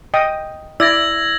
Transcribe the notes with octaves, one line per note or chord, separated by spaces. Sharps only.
D#5 G5 D#6
E4 D5 E6 G#6 A#6